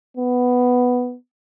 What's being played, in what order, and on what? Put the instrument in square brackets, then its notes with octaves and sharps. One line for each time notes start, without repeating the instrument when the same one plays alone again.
[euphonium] B3